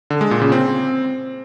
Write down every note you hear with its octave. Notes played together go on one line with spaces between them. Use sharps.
D3
G#3
A#2
C#3
C4